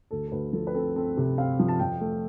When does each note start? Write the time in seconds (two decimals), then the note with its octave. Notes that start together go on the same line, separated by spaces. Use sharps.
0.11 D2 A4
0.27 A4
0.32 D2 B4
0.53 F3 A4
0.67 B4
0.74 C4 A4
0.96 C4 A4
1.17 C3
1.38 C4 F5
1.59 F3
1.68 A5
1.79 F2 G5
2.01 A3